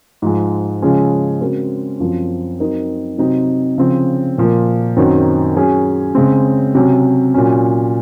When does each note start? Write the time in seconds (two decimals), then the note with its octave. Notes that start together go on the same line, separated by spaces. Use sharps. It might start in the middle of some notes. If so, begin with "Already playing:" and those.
0.22 G#2 F3 G#3
0.82 C#3 F3 G#3 C#4 G#4
1.41 C#3 G#3 C4 F#4 A#4
2.00 F#2 F3 C4
2.60 F#3 C4 D#4 A#4
3.18 C3 F#3 C4 D#4
3.78 C#3 F3 C4
4.38 A#2 F3 A#3
4.97 F#2 D#3 F#3 C4
5.56 F#3 C#4 G#4
6.15 C#3 G#3 C4
6.75 C3 F#3 C#4
7.34 A#2 F#3 C#4